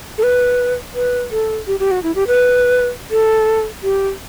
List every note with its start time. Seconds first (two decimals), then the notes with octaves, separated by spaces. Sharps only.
0.18 A4
0.23 B4
0.95 B4
1.31 A4
1.67 G4
1.80 G4
1.91 F#4
2.03 E4
2.15 G4
2.27 B4
3.11 A4
3.83 G4